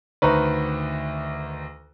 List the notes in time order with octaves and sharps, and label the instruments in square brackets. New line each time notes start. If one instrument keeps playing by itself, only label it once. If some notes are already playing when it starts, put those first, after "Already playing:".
[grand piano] D2 D#3 C#6 [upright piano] B4 C5 A#5